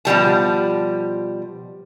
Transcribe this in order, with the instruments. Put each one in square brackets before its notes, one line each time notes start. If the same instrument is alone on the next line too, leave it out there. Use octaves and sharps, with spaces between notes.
[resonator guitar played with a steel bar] B2 F3 G3 A5